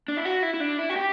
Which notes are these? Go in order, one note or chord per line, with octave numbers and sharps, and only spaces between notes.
D4
E4
F#4
E4
E4
D4
E4
F#4
G4